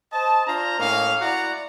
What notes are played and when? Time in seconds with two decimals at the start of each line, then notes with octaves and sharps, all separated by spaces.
0.12 C5 D#5 A5
0.46 D4 F4 C5 A#5
0.79 A2 A#3 C#4 D#5 F5
1.20 E4 F#4 D5 F#5 A#5